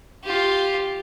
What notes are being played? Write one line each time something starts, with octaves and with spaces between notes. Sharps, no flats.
F4 G4